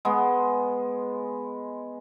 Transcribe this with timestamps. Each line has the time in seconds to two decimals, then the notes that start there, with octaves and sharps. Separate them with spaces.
0.05 G#3 B3